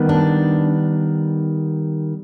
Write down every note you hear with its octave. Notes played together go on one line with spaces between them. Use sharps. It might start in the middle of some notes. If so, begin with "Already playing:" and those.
Already playing: D#3 G3 B3
D4